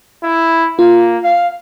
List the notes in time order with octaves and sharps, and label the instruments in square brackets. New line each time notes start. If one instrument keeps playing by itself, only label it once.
[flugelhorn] E4
[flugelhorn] A#3 [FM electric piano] F4
[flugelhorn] F5